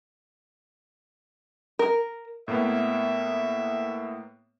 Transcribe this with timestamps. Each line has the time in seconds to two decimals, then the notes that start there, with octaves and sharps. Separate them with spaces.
1.79 A#4
2.48 A2 A#3 B3 E5